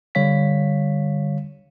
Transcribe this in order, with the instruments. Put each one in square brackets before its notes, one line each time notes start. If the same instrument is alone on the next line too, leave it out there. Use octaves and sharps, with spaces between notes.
[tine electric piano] D3 G3 C#5 F5 B6